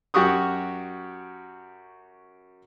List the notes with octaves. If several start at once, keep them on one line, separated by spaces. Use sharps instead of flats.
F#2 F#4 G4 C#6 D#6